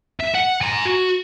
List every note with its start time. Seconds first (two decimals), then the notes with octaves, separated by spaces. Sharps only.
0.20 E5
0.35 F#5
0.61 G#5 A#5
0.85 F#4